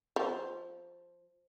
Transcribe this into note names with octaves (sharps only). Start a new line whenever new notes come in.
F3